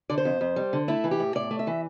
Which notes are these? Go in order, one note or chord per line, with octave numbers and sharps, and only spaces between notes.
D3 D5
C5
F2
F2
G3
D3
A3 E4
E3
G4
A2
A2 D5
A3
E5
E3